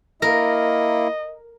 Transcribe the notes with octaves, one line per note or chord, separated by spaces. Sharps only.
A#3 E4 A#4 D#5